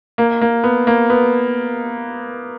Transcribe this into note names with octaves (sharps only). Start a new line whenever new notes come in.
A#3
A#3
B3
A#3
B3